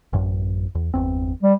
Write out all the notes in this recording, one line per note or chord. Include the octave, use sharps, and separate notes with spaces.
A1 F#2
E2
G1 E2 C4
G3